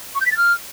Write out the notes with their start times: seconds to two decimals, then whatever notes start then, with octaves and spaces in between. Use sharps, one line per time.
0.15 C#6
0.20 G6
0.26 B6
0.31 A6
0.37 F6